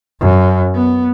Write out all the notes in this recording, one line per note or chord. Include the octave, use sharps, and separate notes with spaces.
F#2
B3